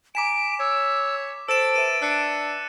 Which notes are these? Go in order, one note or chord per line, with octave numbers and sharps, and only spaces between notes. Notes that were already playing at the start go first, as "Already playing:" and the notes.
G#5 A#5 D6 B6 D7 E7
C#5 E6
A4 C5 E6 A6 D7 E7
B4 E5 D#7
D4 E6 F#6 C#7